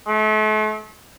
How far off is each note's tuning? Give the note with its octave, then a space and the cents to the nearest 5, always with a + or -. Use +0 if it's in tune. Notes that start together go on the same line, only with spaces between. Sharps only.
A3 -40